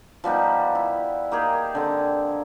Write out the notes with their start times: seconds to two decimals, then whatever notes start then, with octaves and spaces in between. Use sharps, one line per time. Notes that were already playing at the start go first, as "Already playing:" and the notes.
0.24 F3 G3 B3 D#4
0.75 E4
1.31 A#3 D#4 G4 G#4
1.75 D3 C4